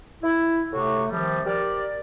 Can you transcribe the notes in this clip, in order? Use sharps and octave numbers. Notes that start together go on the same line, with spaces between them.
E4
A2 C3 A3 F#4
C3 D#3 F3 G3
G4 A#4 D5